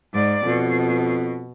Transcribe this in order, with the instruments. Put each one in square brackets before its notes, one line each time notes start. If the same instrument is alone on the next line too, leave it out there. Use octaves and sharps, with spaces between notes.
[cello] G#2 D5
[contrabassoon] F2 [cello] B2